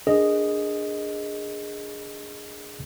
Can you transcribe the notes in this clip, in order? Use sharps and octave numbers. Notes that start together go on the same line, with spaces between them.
D4 G#4 A#4 D#5